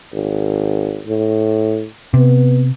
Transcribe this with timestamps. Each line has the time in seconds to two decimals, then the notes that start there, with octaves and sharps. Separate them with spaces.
0.13 G#1
1.06 A2
2.14 C3 B3